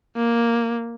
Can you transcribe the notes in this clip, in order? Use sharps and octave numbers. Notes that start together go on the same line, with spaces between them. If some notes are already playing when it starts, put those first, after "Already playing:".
A#3